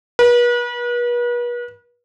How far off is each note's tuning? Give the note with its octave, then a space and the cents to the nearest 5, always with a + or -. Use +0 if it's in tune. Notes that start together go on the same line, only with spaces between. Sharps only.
B4 -40